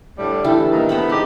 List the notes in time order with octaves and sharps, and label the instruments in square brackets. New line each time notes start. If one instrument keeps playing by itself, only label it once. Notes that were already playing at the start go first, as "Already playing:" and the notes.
[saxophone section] A2 D3 G3
[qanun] E3 G3 D4 [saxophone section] A3 A4
[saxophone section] A#2 D#3
[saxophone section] A3 B3 [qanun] C5 G5 B5
[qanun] G#3 [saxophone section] D#4 G4